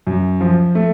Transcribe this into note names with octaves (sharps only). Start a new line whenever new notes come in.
F#2
F3
A3